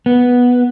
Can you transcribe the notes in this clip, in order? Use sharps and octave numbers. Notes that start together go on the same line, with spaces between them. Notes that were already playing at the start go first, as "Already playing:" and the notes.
B3